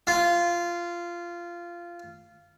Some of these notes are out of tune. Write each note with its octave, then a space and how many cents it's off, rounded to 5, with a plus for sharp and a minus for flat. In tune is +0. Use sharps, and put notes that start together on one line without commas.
F4 -15